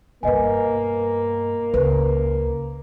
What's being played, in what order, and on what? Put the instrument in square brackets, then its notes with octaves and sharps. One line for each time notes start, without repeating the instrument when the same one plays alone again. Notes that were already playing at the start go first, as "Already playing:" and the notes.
[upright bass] G2 B2 [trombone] A#3 [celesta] B4 D#5 G#5
[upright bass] C#2 [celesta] B4